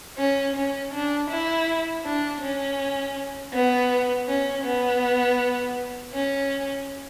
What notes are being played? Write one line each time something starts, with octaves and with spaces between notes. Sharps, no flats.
C#4
C#4
D4
E4
D4
C#4
B3
C#4
B3
C#4